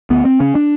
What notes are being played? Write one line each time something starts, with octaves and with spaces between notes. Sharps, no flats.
D2 B3
C4
C#3 C#4
D4